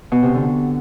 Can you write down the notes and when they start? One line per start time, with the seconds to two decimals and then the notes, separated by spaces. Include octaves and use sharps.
0.12 B2
0.23 C3
0.34 D3